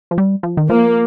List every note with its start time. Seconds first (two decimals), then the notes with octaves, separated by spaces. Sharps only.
0.11 F3
0.18 G3
0.43 F3
0.57 D#3
0.69 F3 A#3